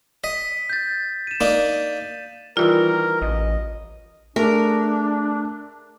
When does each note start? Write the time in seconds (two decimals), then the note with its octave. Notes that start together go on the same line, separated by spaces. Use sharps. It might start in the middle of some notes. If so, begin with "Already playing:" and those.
0.24 D#5 B6
0.70 G6 A6
1.27 D#7 E7
1.41 A#3 D4 D#4
2.57 D#3 E3 G3 F4 A#4
3.22 A1 D#5
4.36 A3 D4 G#4 A#4